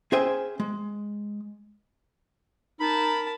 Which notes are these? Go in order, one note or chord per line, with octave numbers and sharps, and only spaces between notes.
C#4 G#4 C5 E5 G5 G#5
G#3
D#4 A#4 A5 B5